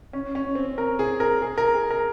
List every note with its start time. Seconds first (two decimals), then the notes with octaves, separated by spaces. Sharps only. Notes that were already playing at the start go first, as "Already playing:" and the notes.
0.13 C#4
0.35 C#4
0.55 C4
0.78 A#4
0.99 G#4
1.20 A#4
1.42 G#4
1.58 A#4
1.74 G#4
1.91 A#4